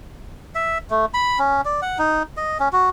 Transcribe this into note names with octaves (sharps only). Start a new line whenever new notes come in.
E5
A3
B5
C#4
D5
F#5
D#4
D#5
C#4
F#4